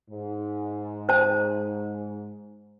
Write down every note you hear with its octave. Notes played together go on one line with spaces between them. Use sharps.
G#2
C5 A5